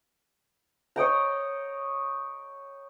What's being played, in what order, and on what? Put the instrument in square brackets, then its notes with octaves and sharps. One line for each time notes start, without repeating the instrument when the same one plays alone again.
[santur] C#5 D#5 G5 A#5